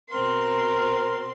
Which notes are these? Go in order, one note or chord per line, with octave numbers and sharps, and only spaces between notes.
B2 C4 A#4 C6